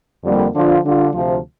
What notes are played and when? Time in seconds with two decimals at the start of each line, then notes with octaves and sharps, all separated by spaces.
0.23 F2 D3 G3 A#3
0.54 D3 F3 D4 F4
0.84 D3 G3 D4 F4
1.13 D2 C3 F3